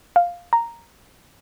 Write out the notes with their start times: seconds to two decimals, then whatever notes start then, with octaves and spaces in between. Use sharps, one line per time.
0.16 F5
0.53 A#5